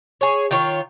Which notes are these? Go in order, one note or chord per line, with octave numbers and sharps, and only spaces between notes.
G#4 C#5
D#3 F4 C#5